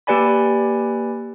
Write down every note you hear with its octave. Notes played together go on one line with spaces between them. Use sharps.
A#3 G4 B4 D5 G#5 B5